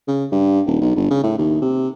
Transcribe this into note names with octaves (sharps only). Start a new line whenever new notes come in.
C#3
G2
D#1
B1
G1
C#3
A2
D#2
C3